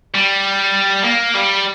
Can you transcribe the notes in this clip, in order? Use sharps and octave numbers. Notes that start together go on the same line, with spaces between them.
G3
A#3
G3